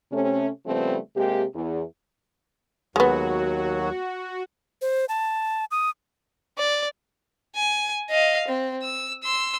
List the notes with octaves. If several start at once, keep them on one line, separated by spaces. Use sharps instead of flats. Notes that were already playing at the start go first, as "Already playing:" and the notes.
C3 A3 C#4
C#3 F3 G3 A3 B3 C4
C3 G#3 A#3 G4
E2
D#2 F#3 G#3 B3 F#4
C5
A5
D#6
D5
G#5
D#5 F5
C4
E6
C6 E6